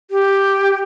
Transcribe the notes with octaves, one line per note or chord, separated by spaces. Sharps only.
G4